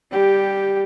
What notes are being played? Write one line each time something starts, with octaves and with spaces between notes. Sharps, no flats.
G3 G4